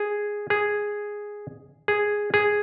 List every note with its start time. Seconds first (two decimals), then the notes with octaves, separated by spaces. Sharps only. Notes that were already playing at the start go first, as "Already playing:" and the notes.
Already playing: G#4
0.50 G#4
1.88 G#4
2.34 G#4